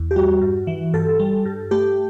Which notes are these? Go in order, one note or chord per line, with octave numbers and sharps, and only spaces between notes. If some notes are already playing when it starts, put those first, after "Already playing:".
Already playing: E2
G4
G3 F#4
G2
E3
G2 A4
G3
G2
A3 G4